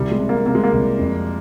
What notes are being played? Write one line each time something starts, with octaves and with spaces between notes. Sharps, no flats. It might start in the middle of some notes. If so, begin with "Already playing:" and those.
Already playing: C2 G3
G#3
C3
A#3
C3 A#3
G#3
A#3
C2
F2